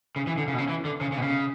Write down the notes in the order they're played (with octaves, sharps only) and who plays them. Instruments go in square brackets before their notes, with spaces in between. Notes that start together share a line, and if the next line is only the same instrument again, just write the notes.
[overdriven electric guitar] C#3
E3
D3
C#3
B2
C#3
E3
D3
C#3
C#3
B2
C#3